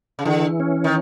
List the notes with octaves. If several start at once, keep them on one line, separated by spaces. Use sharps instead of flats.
C#3
D3 E3
C#4
D#3